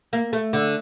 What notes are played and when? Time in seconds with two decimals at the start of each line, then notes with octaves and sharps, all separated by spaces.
0.13 A#3
0.33 A3
0.53 D3